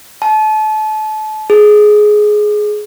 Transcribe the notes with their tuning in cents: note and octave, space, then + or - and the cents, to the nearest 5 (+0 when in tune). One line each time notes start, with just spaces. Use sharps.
A5 -30
G#4 +15